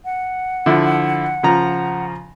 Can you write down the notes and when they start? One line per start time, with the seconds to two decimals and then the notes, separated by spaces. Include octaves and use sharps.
0.05 F#5
0.66 D3 F3 E4
1.43 C#3 F3 A#5